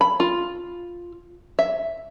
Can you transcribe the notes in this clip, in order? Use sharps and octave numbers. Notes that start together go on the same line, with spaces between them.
B5
F4
E5